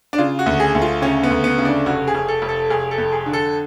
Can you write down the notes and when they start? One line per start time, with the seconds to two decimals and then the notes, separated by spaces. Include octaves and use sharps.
0.13 D4
0.18 C#3 F4
0.39 F#4
0.46 D2
0.60 G#4
0.75 D2
0.82 F4
1.02 C#3 C#4
1.23 B3
1.30 D2
1.44 B3
1.58 C#3
1.65 D4
1.86 F1 F#4
2.07 G#4
2.15 F1
2.28 A4
2.42 F1
2.49 A4
2.70 F1 G#4
2.91 A4
2.98 F2
3.12 G#4
3.26 D3
3.33 A4